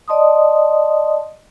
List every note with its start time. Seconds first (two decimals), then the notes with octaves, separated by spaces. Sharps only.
0.08 D5 D#5 A5 C6 D#6